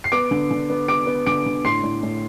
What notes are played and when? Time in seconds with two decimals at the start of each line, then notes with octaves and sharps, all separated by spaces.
0.04 C7
0.12 B3 D6 D7
0.31 D3
0.51 D3
0.70 B3
0.88 B3 D6 D7
1.07 B3
1.26 D3 D6 D7
1.46 D3
1.65 A2 C6 C7
1.83 A2
2.03 A2